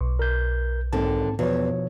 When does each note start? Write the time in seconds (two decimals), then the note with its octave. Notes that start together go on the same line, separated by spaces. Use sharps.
0.01 B1
0.19 A#4 G6
0.93 D#2 G#2 D3 C4 A5
1.39 E2 B2 F3 C#5